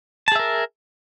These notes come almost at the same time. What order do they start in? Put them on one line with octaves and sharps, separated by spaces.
A5 G#4 E5 A#4